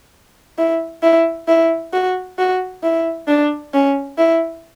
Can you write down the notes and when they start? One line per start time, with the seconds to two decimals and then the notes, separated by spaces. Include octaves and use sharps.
0.58 E4
1.03 E4
1.48 E4
1.93 F#4
2.39 F#4
2.83 E4
3.28 D4
3.74 C#4
4.18 E4